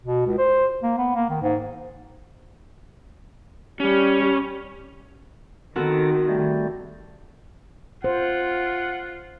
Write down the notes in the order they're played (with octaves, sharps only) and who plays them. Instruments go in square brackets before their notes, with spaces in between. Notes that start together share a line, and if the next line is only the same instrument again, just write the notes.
[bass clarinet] B2
C#2
C5
A#3
B3
A#3
D#3
G#2
[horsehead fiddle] G3 [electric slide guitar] C#4
[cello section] D#3 [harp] B3 C4 F#4 [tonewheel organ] A4 A#4
[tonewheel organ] G3 A3
[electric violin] F4 [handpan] C5 [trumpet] F#5